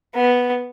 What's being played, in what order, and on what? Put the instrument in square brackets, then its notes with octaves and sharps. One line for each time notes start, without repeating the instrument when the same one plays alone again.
[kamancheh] B3